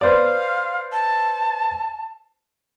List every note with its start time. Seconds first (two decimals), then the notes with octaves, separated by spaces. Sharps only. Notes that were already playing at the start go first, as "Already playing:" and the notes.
0.01 B4 C5 D5 F5
0.92 A5